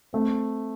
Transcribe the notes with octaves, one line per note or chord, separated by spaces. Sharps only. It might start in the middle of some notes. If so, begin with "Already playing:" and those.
A3 C4